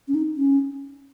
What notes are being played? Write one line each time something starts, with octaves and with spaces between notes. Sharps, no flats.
C#4
D#4
C#4